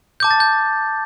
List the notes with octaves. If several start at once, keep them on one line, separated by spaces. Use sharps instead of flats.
A5 D6 G6
A6
G6